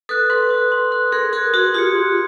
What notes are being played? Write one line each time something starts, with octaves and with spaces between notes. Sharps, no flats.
A4 B4 D#6 F#6
A4 B4 C6
D#6 F#6
C6
D#6 F#6
G#4 A#4 C6
G#4 A#4 D#6 F#6
F#4 G#4 C6
F4 G4 D#6 G#6 C#7
C6